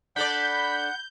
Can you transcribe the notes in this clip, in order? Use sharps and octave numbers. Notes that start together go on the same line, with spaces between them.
D4 A4 D5 F#5 B5 G6